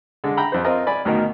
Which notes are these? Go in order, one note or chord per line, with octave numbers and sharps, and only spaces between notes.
D3 G#3
G5 A#5 B5
F2 C5
C4 F4 A#4 D#5
D5 G#5 B5
D2 B2 D#3 A#4 D#5